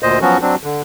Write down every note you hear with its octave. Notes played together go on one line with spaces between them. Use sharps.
D2 A#2 C5 D#5
F3 F#3 B3 C#4 F#4
F#3 C4 D4
D3